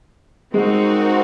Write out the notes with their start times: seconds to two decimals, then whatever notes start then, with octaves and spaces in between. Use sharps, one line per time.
0.54 G#3 C4 D#4 F#4 A#4